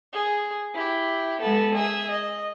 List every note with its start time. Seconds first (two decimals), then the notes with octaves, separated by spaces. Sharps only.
0.12 G#4
0.74 E4 G4
1.41 G#3 B3 A4
1.74 G#4 E5
2.11 D#5